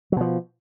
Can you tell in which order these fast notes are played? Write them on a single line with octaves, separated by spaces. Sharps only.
F#3 B2 F3